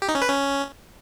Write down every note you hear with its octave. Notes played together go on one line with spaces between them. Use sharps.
G4
D#4
C#4
B4
C#4